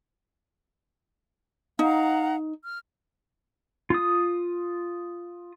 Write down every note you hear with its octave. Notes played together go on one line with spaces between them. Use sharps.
D#4 F5 F#5 A#5
F6
F4 D#6